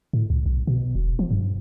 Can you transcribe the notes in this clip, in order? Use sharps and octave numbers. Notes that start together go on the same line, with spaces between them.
A2
C#2
B1
B2
E1
F3
G2